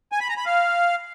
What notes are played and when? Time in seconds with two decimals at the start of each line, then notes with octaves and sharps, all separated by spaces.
0.12 G#5
0.20 B5
0.29 A#5
0.37 B5
0.46 F5